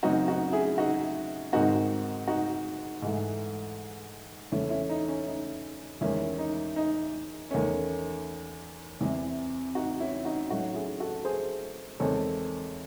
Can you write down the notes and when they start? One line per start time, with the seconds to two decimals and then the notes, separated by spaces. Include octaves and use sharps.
0.03 F#2 C#3 F#3 C4 D#4 F#4
0.28 D#4 F#4
0.52 E4 G#4
0.78 D#4 F#4
1.52 G#2 D#3 G#3 C4 D#4 F#4
2.28 D#4 F#4
3.02 G#2 E3 A3
4.52 E2 C#3 E3 A3 C#4 E4
4.70 C#4 E4
4.90 D#4
5.08 C#4
5.26 D#4
6.01 E2 D#3 G#3 C#4 E4
6.38 D#4
6.76 D#4
7.51 E2 D#3 A3 C#4
9.01 E2 C3 E3
9.75 D#4 F#4
10.00 C#4 E4
10.25 D#4 F#4
10.50 A2 F#3 C#4 D#4 F#4
10.75 E4 G#4
11.00 F#4 A4
11.25 G#4 C5
12.00 E2 D#3 G#3 C4 A4 C#5